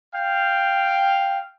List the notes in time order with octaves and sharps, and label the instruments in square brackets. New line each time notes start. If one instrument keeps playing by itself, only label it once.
[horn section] F5 G5